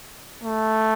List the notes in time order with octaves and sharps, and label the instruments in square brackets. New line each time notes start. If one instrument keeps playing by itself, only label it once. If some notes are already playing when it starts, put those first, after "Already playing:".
[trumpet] A3